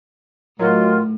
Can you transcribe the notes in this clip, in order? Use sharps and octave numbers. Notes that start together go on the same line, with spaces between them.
A2 D#3 F#3 F4